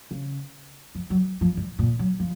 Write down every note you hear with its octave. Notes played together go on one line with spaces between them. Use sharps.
C#3
F3
F#3
F3
G#2
A#2
F#3
F3